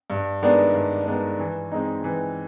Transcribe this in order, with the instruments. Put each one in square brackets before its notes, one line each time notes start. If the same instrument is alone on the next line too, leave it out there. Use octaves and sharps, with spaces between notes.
[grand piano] G2
D#3 G#3 B3 D4
G2
D#3 G#3 B3 D4
E3
G#3 C4 D#4
E3